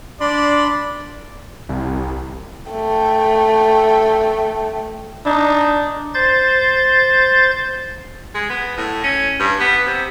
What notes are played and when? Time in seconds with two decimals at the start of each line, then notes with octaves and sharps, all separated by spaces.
0.21 D4 D5 B5 C6
1.69 C2
2.71 A3 G5
5.26 D4 D#4
6.14 C5 G6 A6
8.35 G#3
8.50 B3
8.77 A2
9.03 C#4
9.39 G2
9.60 B3
9.86 C3